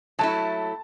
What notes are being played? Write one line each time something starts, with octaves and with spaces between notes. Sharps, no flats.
F#3 A3 E4 A5